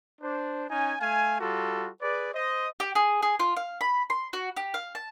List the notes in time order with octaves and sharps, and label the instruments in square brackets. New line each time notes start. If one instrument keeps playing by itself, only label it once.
[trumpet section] D4 C5
C#4 D#4 G#5
A3 F5 G#5
G3 F4 F#4 A4
G#4 B4 D5
C5 D#5
[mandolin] G4
G#4
G#4
F4
F5
B5
C6
F#4
G4
F5
A5